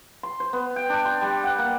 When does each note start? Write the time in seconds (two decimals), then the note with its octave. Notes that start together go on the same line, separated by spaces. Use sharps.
0.23 C6
0.40 C5
0.53 B3
0.76 G5
0.90 D4
1.05 C6
1.21 G3
1.44 F#5
1.59 A#3